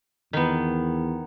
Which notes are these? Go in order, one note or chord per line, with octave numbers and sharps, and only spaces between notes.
E2 D#3 B3